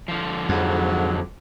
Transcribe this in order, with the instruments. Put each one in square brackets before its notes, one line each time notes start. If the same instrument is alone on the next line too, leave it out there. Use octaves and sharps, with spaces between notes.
[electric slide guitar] D3 F3
[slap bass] F2 [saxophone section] G#2 F#3